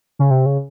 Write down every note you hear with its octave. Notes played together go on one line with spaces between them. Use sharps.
C#3
C3
C#3